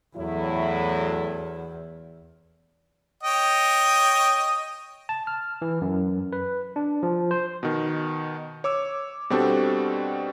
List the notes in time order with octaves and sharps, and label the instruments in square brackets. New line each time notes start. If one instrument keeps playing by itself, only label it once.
[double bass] E2 [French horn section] A2 F#3 E4
[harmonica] C#5 D#5 G5
[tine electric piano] A5
F6
E3
F#2
B4
D4
F3
C5
[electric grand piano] B2 D#3
C#5 D6 E6
B2 G3 C4 D4 F#4 A4